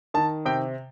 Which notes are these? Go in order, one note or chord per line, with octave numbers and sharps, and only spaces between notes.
D#3 A5
C3 G5